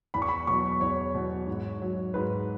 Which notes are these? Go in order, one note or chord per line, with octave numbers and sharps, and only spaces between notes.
E2 B5
C#6
B5
B2 F#3 C#6
E2 C#5
B2 F#3
G#2
F#3
G#2 B4